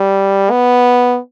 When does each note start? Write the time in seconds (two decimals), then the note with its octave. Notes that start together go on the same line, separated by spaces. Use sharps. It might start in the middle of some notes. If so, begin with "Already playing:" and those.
Already playing: G3
0.51 B3